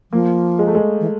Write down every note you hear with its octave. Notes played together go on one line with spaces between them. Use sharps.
F3 A#3
G#3
A3
G#3
E3